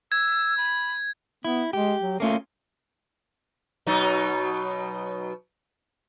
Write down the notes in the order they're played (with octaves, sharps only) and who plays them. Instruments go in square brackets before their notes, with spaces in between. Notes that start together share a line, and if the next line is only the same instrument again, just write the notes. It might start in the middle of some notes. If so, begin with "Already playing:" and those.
[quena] E6 [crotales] G#6
[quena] B5
[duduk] B3 [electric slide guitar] E4
[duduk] G#3 [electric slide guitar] G4
[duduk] F#3
[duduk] A3 [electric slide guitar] A#3 C#4 F4
[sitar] B2 F#3 D#4